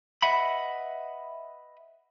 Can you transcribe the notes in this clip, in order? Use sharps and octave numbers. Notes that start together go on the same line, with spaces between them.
B4 D#5 E5 F#5 B5